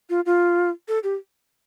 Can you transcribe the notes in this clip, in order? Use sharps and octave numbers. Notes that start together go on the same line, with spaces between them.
F4
F4
A4
G4